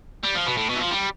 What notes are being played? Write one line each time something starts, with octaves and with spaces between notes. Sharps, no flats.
G3
F3
B2
A2
B2
E3
F3
G3